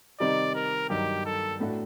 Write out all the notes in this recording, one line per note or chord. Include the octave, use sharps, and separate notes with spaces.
C3 D#3 G3 C4 D#4 D5
A#4
G2 D#3 F#3 G4
A4
A2 A3 D4 F#4